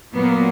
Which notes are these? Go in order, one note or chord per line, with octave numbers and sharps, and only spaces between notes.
A#2 F#3 A#3 B3